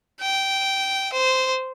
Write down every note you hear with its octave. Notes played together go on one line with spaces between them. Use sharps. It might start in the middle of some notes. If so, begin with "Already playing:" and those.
G5
C5